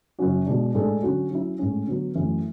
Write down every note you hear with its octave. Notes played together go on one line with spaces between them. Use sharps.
F#2 C#3 F#3 C#4 F#4
B2 G#3 D4
A2 G#3 D4 A4
D3 F#3 C#4 F#4
F#3 C#4 E4
A2 G#3 C#4
D3 F#3 B3
F#2 E3 A3